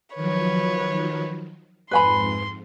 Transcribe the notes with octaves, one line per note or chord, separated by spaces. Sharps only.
D#3 F3 F#3 B4 C#5
F2 G#2 B4 G#5 B5 C6